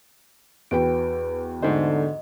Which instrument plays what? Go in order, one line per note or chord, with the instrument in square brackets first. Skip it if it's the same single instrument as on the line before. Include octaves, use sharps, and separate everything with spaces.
[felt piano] E2 F#4 G5 [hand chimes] B4 D7
[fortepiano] G#2 A3 C5 [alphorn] D3 [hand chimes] D#5